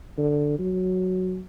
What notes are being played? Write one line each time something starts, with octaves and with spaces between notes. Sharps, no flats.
D3
F#3